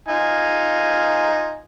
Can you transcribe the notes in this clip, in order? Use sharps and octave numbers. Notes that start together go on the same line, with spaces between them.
D#4 F4 G#5